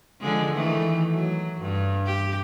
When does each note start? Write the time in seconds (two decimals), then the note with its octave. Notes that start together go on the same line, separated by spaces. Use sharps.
0.21 D3 F3 G#3
0.52 D#3 E3 A3
1.12 F#3
1.60 G2
2.06 G4